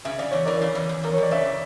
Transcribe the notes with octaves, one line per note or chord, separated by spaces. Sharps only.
C#3 E5
C#3 D5
E2 C#5
E3 A#4 D5
C#3
E2
E2
E2 A#4
C#5
E2 D5
C#3 C#5 E5